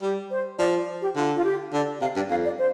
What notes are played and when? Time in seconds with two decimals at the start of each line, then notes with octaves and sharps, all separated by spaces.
0.02 G3 G4
0.31 C5
0.58 F3 D5
1.02 G4
1.16 D3 F4
1.36 F4
1.44 G4
1.73 D3 D5
2.01 C3 F5
2.16 G2 D5
2.30 F2 F5
2.45 D5
2.58 C5